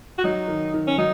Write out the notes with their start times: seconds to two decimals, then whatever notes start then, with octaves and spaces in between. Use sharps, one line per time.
0.18 F#4
0.24 F#3 D#4
0.48 D#3
0.74 D#3
0.87 C#4
0.98 F#3 D#4